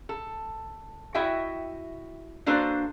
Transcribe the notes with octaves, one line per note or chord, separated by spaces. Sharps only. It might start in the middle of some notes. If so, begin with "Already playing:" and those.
A4
E4 F#4 D#5 E5 G5
A#3 D4 F#4 A4 B4 C5